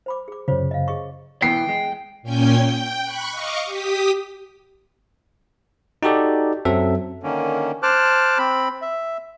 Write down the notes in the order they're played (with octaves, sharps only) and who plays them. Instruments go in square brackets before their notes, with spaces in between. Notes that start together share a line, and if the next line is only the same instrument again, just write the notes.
[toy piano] C5 B5 D6
G#4 D6
[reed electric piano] F#2 C#3 [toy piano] F4 C5 C#5
[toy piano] D#5 F5
G#4 D#5 C#6
[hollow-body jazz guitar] B2 E3 B3 [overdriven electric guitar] G5 [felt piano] C7
[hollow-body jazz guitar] G#3
[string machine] A#2 C#4 G5 G#5 G6
G5
B5 C#6 F#6
D#5 F5 C#6 D6
G4 D#6 B6
[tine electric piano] D#4 F#4 G4 A4 D5
F#2 F#3 C4 A4 E5
[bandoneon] D3 D#3 A#3 C#4
C5 A5 D6 F6 F#6
C4 B5
E5